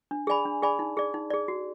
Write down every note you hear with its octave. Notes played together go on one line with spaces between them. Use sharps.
D4
G#4 D5 G#5 B5
D4
G#4 D5 G#5 B5
D#4
G#4 D5
D#4
G#4 D5
F#4